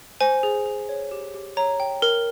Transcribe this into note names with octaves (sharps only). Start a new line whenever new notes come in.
C5 G#5
G#4
G#4
C#5
G4
G4
C#5 A#5
G5
A#4